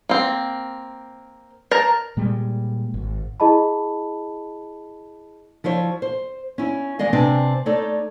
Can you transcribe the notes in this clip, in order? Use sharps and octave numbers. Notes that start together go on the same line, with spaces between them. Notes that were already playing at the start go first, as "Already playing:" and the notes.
A#3 C4
A#4 A5 A#5
A#2 G3 G#3
G#1
E4 G#4 D#5 A5 B5
F3 E4 C5 C#5
C5
C#4 E4
E3 G#3 D5 D#5 F5
C3 C4 D4 B4 G5 G#5
A3 D#4 A4 C#5 D5